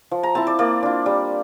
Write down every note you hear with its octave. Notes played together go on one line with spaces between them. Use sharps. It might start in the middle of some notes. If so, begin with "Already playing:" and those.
F3
A#5
C4 E4 A5
D5
A#3 D5
D4 F4
G3